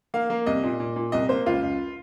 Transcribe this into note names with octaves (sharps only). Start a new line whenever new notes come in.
A#3 F5
A#3
C2 D#5
A#2
A#2
A#2
C2 D#5
A#3 C5
C#2 F4
C#2